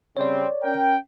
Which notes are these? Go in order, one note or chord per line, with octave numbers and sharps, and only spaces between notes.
C#3 G3 C4 C#5 D5
C#4 A#4 G5